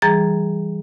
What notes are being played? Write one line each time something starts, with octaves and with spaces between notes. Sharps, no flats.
E3 G3 G#4 A#5 A6